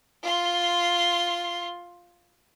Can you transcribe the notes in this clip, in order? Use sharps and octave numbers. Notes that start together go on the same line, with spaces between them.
F4 C6